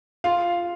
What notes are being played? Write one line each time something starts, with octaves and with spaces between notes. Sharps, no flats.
F4 F5